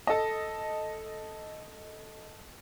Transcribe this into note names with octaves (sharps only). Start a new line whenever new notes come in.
A4 D#5